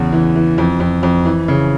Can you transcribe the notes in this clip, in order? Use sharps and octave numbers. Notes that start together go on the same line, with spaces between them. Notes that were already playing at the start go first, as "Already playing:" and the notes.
Already playing: E2 C#3
E3
E3
F2
F2
F2
E3
C#3